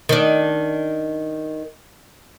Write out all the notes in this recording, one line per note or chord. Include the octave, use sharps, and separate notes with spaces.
D#3 D4